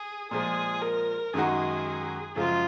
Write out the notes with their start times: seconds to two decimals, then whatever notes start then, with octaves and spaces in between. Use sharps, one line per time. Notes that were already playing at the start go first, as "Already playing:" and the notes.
Already playing: G#4
0.31 A#2 F3 G#3 G#4
0.82 A#4
1.34 F#2 D#3 G#3 D#4 F#4 G#4
2.36 F#2 C#3 F3 G#3 F4